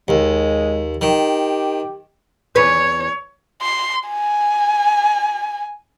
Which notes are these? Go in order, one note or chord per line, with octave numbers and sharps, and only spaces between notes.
D#2 G#3
D#3 G4
E2 B4 C#5
C6
G#5